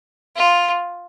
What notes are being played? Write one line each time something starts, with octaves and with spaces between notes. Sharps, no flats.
F4